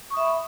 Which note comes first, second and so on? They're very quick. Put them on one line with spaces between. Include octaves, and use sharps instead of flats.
C#6 D#6 E5 B5